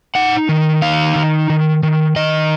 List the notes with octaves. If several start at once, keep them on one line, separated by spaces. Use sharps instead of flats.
D#4 F#5
D#3
D#4 F5
D#3
D#3
D#3
D#3 D#5